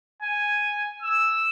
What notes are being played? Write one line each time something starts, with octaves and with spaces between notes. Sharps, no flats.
G#5
E6